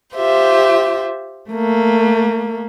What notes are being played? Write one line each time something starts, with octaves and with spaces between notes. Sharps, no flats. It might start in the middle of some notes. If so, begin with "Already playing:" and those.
F4 G4 C5 E5
A3 A#3